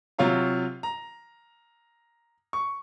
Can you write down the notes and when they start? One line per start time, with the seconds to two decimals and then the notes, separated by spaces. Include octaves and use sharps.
0.19 C3 F#3 F4 C#5 F5 A#5
0.83 A#5
2.53 C#6